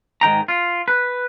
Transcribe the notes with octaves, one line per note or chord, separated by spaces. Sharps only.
G#2 D#3 G5 A#5
F4
B4